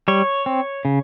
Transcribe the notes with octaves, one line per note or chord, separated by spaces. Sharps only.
G3 C#5
C4
C#3